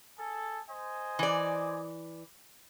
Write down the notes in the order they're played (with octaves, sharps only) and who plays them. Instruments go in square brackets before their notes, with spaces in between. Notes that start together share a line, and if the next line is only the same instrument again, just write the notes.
[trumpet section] G#4 A4
C5 D#5 G#5
[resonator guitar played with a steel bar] E3 D5